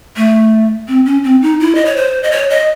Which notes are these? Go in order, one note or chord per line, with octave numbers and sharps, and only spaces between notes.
A3
C4
C#4
C4
D#4
E4
D#5
C#5
C5
D#5
C#5
D#5